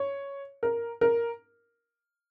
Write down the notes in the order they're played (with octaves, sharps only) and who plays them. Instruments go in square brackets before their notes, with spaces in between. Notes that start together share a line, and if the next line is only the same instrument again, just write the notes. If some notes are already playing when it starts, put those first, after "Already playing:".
Already playing: [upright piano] C#5
A#4
A#4